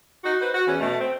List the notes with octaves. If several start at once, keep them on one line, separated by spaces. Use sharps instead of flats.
D#4 F#4
B4 C5
F#4
E2 E3 C#4
B2 A3
C4